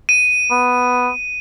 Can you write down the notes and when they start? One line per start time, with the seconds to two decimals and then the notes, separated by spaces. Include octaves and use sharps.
0.09 D#7
0.51 B3